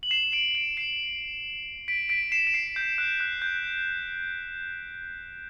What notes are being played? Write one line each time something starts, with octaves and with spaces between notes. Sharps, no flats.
F#7
C7 E7
D7 F#7
D7 F#7
C7 E7
B6 D7
B6 D7
C7 E7
D7
C7
G6
F#6
F#6
G6